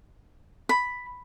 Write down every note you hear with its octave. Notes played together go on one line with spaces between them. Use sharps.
B5